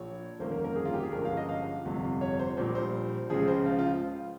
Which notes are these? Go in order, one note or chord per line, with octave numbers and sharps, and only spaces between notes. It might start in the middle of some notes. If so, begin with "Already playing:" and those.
Already playing: A#1 A#2 C#5
G1 F2 D#3 A#3 C#4 C5
A#4
A#4
G#4
F4
G4
G#4
G1 G2 F3 G#3 C#4 A#4
F5
D#5
F5
G1 F2 C3
C#5
C5
A#1 A#2 G3 C5
C5
C#2 C#3 F3 G#4
C5
F4
F4